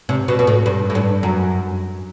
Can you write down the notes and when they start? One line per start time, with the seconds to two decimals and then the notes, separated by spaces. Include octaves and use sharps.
0.09 C3
0.28 B2
0.39 B2
0.47 A2
0.66 G2
0.90 A2
0.95 G2
1.23 F#2